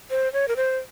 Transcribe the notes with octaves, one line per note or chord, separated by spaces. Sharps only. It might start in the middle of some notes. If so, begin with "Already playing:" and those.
C5
C#5
A#4
C5